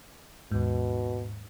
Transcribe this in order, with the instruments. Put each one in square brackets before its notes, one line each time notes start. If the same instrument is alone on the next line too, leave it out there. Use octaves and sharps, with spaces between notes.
[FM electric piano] D#2 G#2 [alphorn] B2